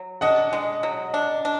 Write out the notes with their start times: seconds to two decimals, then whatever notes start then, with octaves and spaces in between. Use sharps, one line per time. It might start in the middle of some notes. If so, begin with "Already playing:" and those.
Already playing: F#3
0.21 D4 D#5 F#5
0.53 G#3
0.83 F#3
1.14 D4
1.45 D4